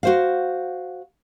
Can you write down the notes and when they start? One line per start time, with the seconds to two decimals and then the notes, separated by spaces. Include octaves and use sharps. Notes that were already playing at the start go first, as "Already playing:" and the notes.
0.03 F#4 C5 F5